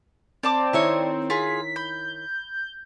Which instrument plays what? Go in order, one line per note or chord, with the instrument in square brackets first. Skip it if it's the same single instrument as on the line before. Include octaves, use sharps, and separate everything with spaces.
[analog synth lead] C4 [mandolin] D5 A5 D6
[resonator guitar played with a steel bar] D#3 E4 C#5
[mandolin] F4 G#4 [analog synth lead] B6
[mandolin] B5 [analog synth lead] G6